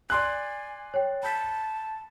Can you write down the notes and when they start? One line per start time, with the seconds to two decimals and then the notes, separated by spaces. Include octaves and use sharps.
0.10 D5 G#5 C6 F#6
0.94 C#5 G5
1.23 A5 B5 G6 B6